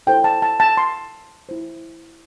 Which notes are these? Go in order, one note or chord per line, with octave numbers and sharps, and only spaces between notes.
E4 A4 C5 G5
A5
A5
A5
C6
E4 C5